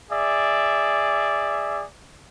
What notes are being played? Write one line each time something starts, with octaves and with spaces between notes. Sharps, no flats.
G#4 D5 E5